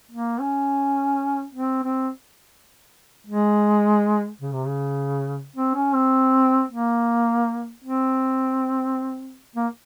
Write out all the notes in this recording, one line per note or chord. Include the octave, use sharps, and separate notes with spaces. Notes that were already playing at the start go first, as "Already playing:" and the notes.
A#3
C#4
C4
C4
G#3
C#3
C3
C#3
C4
C#4
C4
A#3
C4
A#3